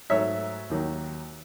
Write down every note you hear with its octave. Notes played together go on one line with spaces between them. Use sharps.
G#2 F#3 A3 C#5 E5
D#2 D#3 F#3